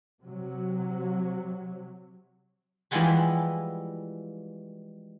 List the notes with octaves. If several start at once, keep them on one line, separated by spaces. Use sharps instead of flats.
C3 F#3
E3 F3 G3 G#3 B3 B4